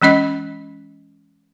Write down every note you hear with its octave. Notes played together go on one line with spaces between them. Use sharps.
E3 G#3 C#4 D#5